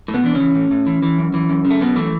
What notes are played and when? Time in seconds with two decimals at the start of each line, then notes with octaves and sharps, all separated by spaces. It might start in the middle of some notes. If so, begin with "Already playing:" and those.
0.08 A2
0.14 B2 B3
0.24 E3 D4
0.35 C#3 C#4
0.40 E3
0.55 A2
0.71 A2
0.86 E3
1.03 E3
1.18 F#2
1.34 E3
1.49 F#2
1.65 C#3
1.70 A3
1.81 F#2 B2 B3
1.96 E3 A3